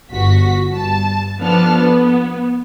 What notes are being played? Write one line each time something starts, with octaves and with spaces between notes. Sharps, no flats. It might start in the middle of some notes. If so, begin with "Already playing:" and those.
G1 F#4 B6
G2 A5
F3 B3 D4 A4 A5 F6
B3